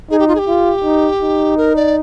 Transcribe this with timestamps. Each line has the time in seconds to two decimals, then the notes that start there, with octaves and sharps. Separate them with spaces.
0.11 D#4 G#4
0.19 G4
0.28 F4
0.35 G#4
0.39 G4
0.48 F4
0.84 D#4
1.21 D#4
1.57 A#4
1.76 D5